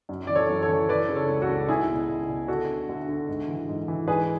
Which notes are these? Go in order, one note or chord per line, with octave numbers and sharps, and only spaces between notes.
F#2
E3 D5
A4 C#5
F#2
A4 C#5
E3
E3 B4 D5
C#3
A4 C#5
C#2
F#4 A4
C#2
C#2 E4 G#4
B2
C#2
B2
D2 F#4 A4
D3
D2
D3
G#2
E3
G#2
E3
G#2 G#4 B4